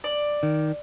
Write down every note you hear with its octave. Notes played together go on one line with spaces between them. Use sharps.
D5
D#3